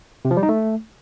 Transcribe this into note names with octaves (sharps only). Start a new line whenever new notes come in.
C3
F3
G3
D#4
A3